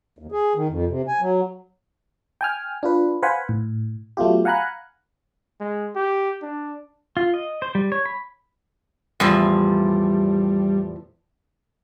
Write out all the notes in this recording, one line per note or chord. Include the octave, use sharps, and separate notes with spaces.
D#2
G#4
D#3
F2
C3
G#5
F#3
G5 G#5 F6
D4 F4 B4
B4 C5 F5 F#5 G#5 B5
A2
F#3 A3 B3 F4 G4
F5 F#5 G#5 A#5 B5 F#6
G#3
G4
D4
F4
D#5
C5
G3
C#5
B5
E2 A2 F3 G3